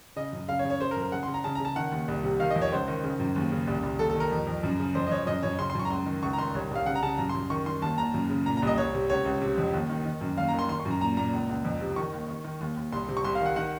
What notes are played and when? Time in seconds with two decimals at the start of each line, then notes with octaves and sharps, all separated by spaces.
0.16 C#3 D#5
0.33 F#2
0.48 C#3 F5
0.59 C#5
0.65 C#3
0.70 C#5
0.80 C#3 C5
0.91 A#4
0.96 F#2
1.02 A#4
1.12 C#3 F#5
1.23 C6
1.28 C#3
1.34 A#5
1.44 C#3 A5
1.55 A#5
1.60 C#3 A5
1.76 D#3 F#5
1.92 D#2
2.08 C2
2.24 C3
2.40 D#3 F5
2.50 D#5
2.56 F2
2.61 C#5
2.72 C#2 C5
2.88 D#3
3.04 C#3
3.19 F#2
3.36 D#2
3.52 C#3
3.67 C2
3.83 C2
3.99 D#2 A4
4.10 A4
4.15 D#3 A#4
4.31 F2
4.47 F2
4.63 F#2
4.79 C#3
4.95 F2 C5
5.07 D#5
5.11 F2 C#5
5.27 F#2 D#5
5.43 F#2 C#5
5.59 C#3 C6
5.70 C6
5.75 F#2 C#6
5.85 A#5
5.90 C#2 C6
6.06 D#3
6.23 C#2 C#6
6.33 A#5
6.38 D#3 C6
6.54 C2 C#5
6.71 C2 F5
6.86 C#3 F#5
6.95 A#5
7.02 C#3 A5
7.18 F#2 A#5
7.29 C6
7.34 F#2
7.50 D#3 C#6
7.66 D#3 C6
7.82 D#2 A5
7.98 D#2 A#5
8.14 F#2
8.30 C#3
8.46 A#2 A#5
8.57 A#5
8.62 C2 D#5
8.78 C2 C#5
8.94 C3
9.10 C#2 C#5
9.26 C#2
9.41 C3
9.58 F2
9.74 D#2
9.90 D#3
10.05 D#3
10.21 F#2
10.37 D#2 F5
10.48 A#5
10.54 D#3
10.59 C6
10.69 D#3 C6
10.80 C#6
10.85 F#2
10.90 A#5
11.01 A#2 A#5
11.17 A#2 A#5
11.33 C#2
11.49 C#2
11.65 F2
11.81 C3
11.96 D#3 C#6
12.13 D#2
12.28 D#3
12.45 D#3
12.61 D#2
12.77 D#2
12.92 C2 C6
13.08 C3
13.17 C#6
13.24 C2 C6
13.35 F5
13.40 D#3
13.46 F#5
13.56 D#3 F#5